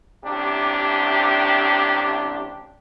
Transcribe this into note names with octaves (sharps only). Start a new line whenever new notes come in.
A1 C3 D4 G4